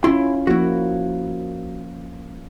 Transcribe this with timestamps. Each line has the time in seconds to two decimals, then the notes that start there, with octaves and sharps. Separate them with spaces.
0.04 C#4 E4 F4 C6
0.47 F3 A#3 E4 F#4